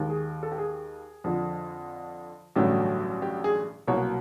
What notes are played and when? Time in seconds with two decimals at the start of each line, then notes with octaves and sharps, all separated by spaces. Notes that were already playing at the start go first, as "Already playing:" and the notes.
Already playing: D#2 D#3 G#3
0.10 G#4
0.43 A4
0.52 G4
0.58 G#4
1.24 F2 D3 F3
2.56 A1 G2 D3 F#3 A3 G4
3.22 G4
3.44 G#4
3.87 C2 B2 F#3 A#3 C#5